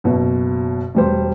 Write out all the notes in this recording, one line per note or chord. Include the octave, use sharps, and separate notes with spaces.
F#1 B2
E1 G3 C5